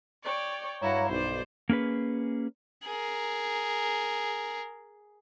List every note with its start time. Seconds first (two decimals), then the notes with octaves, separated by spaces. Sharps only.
0.24 C#5 D5 G5
0.81 G2 E4 F#4 C#5 F5 A#5
1.09 B1 C5 D5
1.69 A#3 C#4 G#4 B4
2.84 G#4 A#4